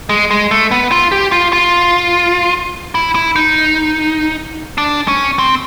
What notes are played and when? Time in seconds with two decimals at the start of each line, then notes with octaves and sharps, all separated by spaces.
0.09 G#3
0.31 G#3
0.51 A3
0.71 B3
0.92 F4
1.12 G4
1.32 F4
1.53 F4
2.95 E4
3.15 E4
3.36 D#4
4.78 D4
5.08 C#4
5.39 C4